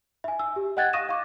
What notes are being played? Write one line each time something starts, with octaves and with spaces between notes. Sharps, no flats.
E5 G#5
E6
G4
D#5 F#5 G5 F#6 G#6 A6
F5 C#6 D#6 A#6 D#7 E7
F5 C#6 D6